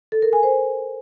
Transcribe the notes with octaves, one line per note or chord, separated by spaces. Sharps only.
A4
A#4
G#5
C5